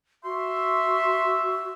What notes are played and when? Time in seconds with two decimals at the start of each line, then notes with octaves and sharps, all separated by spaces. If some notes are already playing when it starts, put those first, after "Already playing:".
0.24 F#4 E5 C6